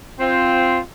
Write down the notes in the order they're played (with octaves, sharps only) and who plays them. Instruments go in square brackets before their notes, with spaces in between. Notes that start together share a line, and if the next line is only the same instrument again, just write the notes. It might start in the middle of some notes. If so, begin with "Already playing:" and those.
[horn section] C4 F4 C5